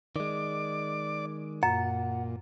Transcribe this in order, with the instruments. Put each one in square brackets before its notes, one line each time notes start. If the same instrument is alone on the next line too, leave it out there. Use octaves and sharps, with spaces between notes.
[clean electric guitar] D#3 G#3 [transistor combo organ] D5 D6
[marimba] F#2 [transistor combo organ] A#2 [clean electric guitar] F#5